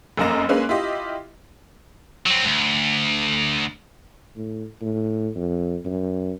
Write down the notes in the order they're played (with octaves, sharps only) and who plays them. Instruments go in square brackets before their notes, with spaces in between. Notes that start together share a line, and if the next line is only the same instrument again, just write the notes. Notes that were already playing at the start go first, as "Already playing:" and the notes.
[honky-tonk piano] F1 F#2 A#3 D#5 A#5 E7
G#3 A#3 C#4 B4
E4 F4 G4 D#5
[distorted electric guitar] F#3 C4
D2
[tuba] A2
A2
F2
F#2